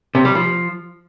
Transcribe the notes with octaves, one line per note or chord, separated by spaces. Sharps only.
C3
G3
F3